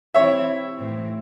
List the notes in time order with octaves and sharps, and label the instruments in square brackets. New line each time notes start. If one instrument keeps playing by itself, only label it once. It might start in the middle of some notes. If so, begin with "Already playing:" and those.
[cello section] E3 C4 E4 [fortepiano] C#5 E5
[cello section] A2 E3 C4